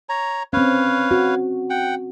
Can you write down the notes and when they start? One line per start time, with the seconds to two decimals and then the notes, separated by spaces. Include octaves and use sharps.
0.09 C#5 A#5
0.53 C4 C#4 B4 C#5 F5
1.11 F#4
1.70 F#5 G5